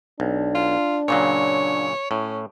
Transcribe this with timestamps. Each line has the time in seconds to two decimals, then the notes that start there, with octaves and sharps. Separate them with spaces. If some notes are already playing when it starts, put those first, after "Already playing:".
0.20 B1 D4
0.55 F4
1.08 A#2 C#3 F#3 C#5
2.11 A2 C#4